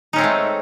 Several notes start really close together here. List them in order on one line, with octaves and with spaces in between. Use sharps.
D#4 C#4 C4 G#3 A3